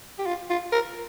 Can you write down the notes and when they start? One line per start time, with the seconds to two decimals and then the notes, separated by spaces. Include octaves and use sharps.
0.18 G4
0.26 F4
0.50 F4
0.72 A#4